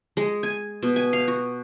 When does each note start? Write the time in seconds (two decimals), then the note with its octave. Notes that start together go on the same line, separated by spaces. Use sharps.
0.17 G#3
0.43 G#5
0.83 B2
0.96 G#5
1.13 F5
1.28 F#4